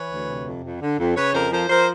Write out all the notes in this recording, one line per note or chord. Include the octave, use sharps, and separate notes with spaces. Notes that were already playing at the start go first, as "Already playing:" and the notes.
Already playing: E3 B4 C#5
D2
C3
F2
F2
D3
F2
C#3 B4 C#5
F2 A#4 C5
F3 A#4 C5
F3 A#4 C5